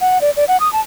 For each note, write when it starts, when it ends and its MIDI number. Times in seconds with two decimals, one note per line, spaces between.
0.01 0.21 78
0.21 0.31 74
0.37 0.45 74
0.48 0.59 78
0.60 0.71 87
0.73 0.80 81